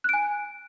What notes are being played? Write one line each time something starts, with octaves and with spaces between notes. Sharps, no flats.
G#5 F#6 D7